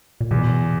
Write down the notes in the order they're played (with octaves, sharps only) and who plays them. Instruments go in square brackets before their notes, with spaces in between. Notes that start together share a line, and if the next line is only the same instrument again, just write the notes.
[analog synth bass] A#2
[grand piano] E2 [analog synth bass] B2